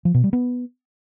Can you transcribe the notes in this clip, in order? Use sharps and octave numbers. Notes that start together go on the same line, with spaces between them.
F3
B2
G3
B3